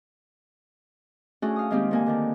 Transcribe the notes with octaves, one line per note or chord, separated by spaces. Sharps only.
A3 C#4 D4 F#4 G#4
F5 D#6
D#3 G#3 A#3 C4 D#4 G4
D3 A#3 G#5
D3 D#3 D4